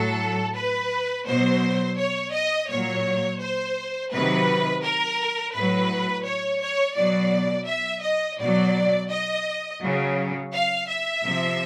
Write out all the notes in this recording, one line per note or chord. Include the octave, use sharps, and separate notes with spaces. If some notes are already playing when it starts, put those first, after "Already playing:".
Already playing: A2 F#3 A4
B4
B2 F#3 C5
C#5
D#5
A#2 F#3 C#5
C5
C3 D#3 F#3 B4
A#4
A2 F#3 B4
C#5
C#5
B2 F#3 D5
E5
D#5
B2 F#3 D5
D#5
C#3 F#3
F5
E5
C3 F3